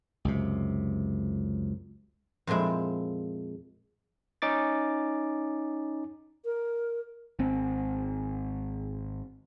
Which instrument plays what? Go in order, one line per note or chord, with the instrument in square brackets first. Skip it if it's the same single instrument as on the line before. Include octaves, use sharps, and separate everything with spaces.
[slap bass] C#2 F#2 C3
[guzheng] F2 A#2 F3 G#3 E4
[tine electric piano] C#4 D#4 D6 A6
[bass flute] A#4
[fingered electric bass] G#1 C4